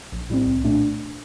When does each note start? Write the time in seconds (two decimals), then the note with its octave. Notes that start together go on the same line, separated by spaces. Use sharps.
0.12 A#1
0.29 A2 G3 C4
0.46 C2
0.64 A#2 A3 D4